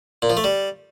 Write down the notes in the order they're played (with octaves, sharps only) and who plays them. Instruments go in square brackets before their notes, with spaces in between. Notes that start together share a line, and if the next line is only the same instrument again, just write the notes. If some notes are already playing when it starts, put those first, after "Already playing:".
[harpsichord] A#2
F3
A3
G3